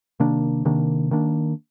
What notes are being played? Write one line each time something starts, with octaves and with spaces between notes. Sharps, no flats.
C3 D#3 A#3 D4
C3 D#3 A#3 D4
D#3 A#3 D4